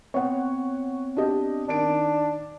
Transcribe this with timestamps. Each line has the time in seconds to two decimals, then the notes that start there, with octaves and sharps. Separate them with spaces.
0.14 B3 C4 C#5 F#5
1.17 D4 G4 D#5
1.69 D#3 D4 D7